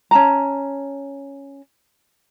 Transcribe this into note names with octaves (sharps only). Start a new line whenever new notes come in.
C#4 A5 A#5